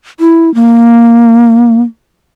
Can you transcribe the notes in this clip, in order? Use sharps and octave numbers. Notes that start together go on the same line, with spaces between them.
E4
A#3